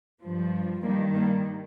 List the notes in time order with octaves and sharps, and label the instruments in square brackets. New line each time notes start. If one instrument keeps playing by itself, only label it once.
[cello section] G2 F3
G2 D#3 G3 A#3
G3 A#3